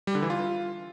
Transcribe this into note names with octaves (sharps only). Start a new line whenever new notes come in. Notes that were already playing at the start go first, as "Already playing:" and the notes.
G3
D3
E3
F4